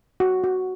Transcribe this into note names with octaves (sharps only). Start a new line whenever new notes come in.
F#4
F#4